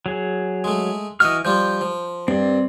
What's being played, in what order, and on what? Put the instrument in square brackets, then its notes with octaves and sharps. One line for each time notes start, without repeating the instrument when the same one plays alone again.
[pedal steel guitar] F#3 G#4
[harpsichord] G#3 A3
[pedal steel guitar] E3 F6 [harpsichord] F#4 D#5
[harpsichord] F3 G3 F4 [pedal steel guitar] G6
[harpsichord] F3
[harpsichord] G2 [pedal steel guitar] C4 D5